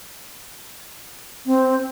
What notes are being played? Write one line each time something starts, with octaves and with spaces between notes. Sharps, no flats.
C4